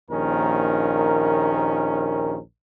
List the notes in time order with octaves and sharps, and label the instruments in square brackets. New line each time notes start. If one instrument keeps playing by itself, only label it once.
[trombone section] A#1 D#2 D#3 C#4 A#4